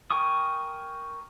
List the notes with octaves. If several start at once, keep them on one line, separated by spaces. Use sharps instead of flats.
A#4 G5 G#5 C#6 D#6